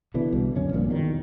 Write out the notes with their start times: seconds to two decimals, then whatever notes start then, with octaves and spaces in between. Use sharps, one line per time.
0.14 B2 D3 E3
0.32 C2 B2
0.55 F#2 D3 C#4
0.73 A#1 G2 A#2 F3
0.88 E2 B2 D3 D#3